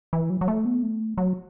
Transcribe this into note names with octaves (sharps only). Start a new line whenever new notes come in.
E3
F#3
F#3
A3
B3
A3
F#3